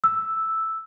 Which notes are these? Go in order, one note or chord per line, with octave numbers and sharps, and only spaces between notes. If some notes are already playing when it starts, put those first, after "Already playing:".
E6